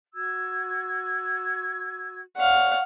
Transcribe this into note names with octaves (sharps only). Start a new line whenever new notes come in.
F#4 E6 G#6
C#5 D5 F5 F#5 C#6